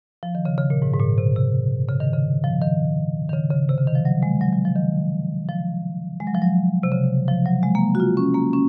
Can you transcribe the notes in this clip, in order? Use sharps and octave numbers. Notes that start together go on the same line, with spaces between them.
F3
D#3
C#3
C#3
A#2
G#2
G#2
A#2
C3
C3
C#3
D#3
C#3
F3
D#3
D#3
C#3
C#3
C3
C#3
D#3
F3
F#3
G#3
F#3
F#3
F3
D#3
F3
G#3
F#3
F3
F#3
C3
C#3
F3
F#3
G#3
A#3
F#4
F4
C#4
A#3
C#4